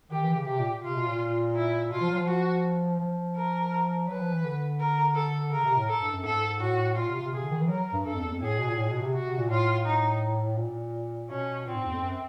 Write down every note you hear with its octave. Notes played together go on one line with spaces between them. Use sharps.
D#3 G4
E3
C#3
C3 G4
A#2
C3 F4
B2
A#2
E4
B2 F4
F3
F#3
F3
F#4
F3
A#4
F#3 B4
F3
E3
D3
A#4
A4
C#3 A#4
C3
A2
A4
G2
F#2
G#2 A4
A2 F#4
A#2 F4
C3
C3
C3 G#4
D3
D#3
E3
F#3 A#4
G2
G2 A4
F2
E2
F2
A2 G#4
B2
A#2
A2
B2
C3
F#4
C3
A#2
A2 F4
D#4
A#2
B2 C#4
A#2 C4
G#2
E2
F2
F#2